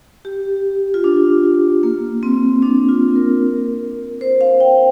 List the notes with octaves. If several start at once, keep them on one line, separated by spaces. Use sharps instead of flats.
G4
F4
D4
A#3
C4
D4
F4
A#4
C5
F5
G5